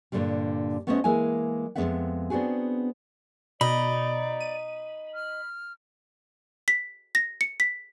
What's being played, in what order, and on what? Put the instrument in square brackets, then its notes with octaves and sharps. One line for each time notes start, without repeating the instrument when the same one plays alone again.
[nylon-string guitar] G2 A#2 D3 E3 F3 G3
A3 B3 C#4 F#4 C5 D#5
E3 G#3 A#3 E4 G#5
F2 E3 G#3 B3 E5 F#5
B3 C4 D4 F#4 G#4
[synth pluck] B2 [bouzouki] D#4 [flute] D5 [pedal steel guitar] B5
[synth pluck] D#7
[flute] F6
[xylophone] B6
A#6
C#7
B6